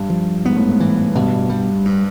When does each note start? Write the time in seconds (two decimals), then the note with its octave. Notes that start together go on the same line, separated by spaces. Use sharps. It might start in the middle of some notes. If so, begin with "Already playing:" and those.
Already playing: G2
0.10 F3
0.45 G#2 B3
0.56 A2
0.69 G#2
0.80 E3
1.15 G2 B2
1.49 G3
1.85 G2